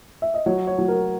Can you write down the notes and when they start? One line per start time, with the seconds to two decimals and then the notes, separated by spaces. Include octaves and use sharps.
0.22 E5
0.34 D#5
0.46 F#3 C#5
0.67 C#5
0.79 F#3
0.88 A#4